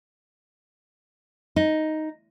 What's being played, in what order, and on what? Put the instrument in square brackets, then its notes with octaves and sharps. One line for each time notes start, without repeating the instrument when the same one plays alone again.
[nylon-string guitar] D#4